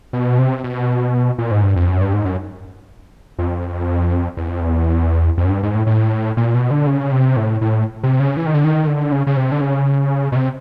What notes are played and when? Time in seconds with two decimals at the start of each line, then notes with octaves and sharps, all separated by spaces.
0.13 B2
0.39 C3
0.64 B2
1.38 A#2
1.51 G#2
1.63 G2
1.76 F2
1.89 F#2
2.01 G2
2.13 G#2
2.25 F#2
3.39 F2
4.37 E2
4.48 F2
4.60 E2
5.38 F2
5.45 F#2
5.50 G2
5.63 G#2
5.75 A2
5.87 A2
6.37 A#2
6.54 B2
6.71 D3
6.87 C#3
7.12 C3
7.37 A2
7.61 A2
8.03 C3
8.20 C#3
8.37 E3
8.46 D#3
8.54 D3
8.64 D#3
8.87 D3
9.12 C#3
9.27 C#3
9.37 C3
9.52 D3
9.61 C#3
10.32 B2
10.36 C3